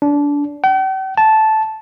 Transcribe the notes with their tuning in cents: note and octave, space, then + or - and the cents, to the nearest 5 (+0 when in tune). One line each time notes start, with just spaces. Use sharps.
D4 -25
G5 -45
A5 -10